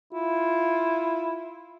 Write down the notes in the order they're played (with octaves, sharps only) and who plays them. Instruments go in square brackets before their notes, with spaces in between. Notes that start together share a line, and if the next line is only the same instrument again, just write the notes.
[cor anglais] E4 [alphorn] F4